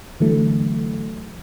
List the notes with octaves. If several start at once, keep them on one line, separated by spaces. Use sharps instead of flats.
D3 E3 F#3 A3